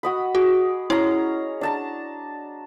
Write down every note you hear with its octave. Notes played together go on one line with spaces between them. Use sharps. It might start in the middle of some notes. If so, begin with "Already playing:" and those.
F#4 D#5 B5
F#4 G#4
C#4 E4 A#5
D4 A5 A#5